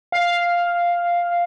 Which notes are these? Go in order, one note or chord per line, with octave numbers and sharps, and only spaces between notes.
F5